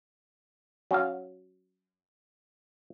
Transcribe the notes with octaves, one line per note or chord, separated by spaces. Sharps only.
F#3 C#4 F#4 F5